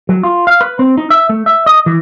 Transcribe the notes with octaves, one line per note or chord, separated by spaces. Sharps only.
F#3
F4
F5
B4
C4
D#4
E5
A3
E5
D#5
E3